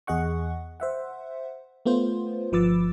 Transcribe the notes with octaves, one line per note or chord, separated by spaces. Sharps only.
E2 G#4 D#5 F#5 C#6
C5 E5 F#5
A3 B3 F4 C5
G1 F3 B4 D6 E6 A6